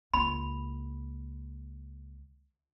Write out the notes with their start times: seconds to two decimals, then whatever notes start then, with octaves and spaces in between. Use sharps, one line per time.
0.14 C#2 A#3 B5